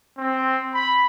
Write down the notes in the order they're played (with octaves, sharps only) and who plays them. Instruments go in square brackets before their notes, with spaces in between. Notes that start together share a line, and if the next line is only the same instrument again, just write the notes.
[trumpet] C4
B5